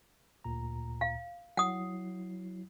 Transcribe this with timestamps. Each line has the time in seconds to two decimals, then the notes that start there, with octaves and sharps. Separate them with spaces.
0.44 D2 A#2 A#5
1.01 F5
1.57 F#3 E4 F#5 D#6 C7